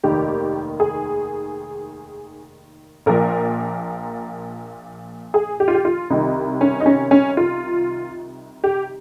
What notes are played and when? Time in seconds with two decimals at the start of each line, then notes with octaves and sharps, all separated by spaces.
0.03 F1 D#2 D#3 G4
0.80 G#4
3.06 A#1 A#2 F3 A#4
5.34 G#4
5.60 G4
5.68 F4
5.74 G4
5.85 F4
6.10 C2 C3 D#3 D#4
6.61 C#4
6.80 D#4
6.86 C#4
7.11 C#4
7.37 F4
8.64 G4